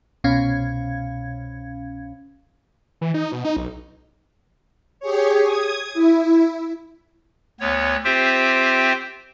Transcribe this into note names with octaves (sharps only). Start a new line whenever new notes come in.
C2 B2 C#4 F5 G#6
E3
D#4
B2
D#4
B1
G4 G#4 C#5
D#6 G#6
E4
D2 B3 C#5
C4 F4 G4 C5 E5 G5